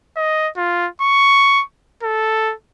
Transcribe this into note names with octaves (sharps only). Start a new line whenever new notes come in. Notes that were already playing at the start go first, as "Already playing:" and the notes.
D#5
F4
C#6
A4